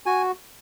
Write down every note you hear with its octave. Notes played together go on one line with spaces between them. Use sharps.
F#4 G#5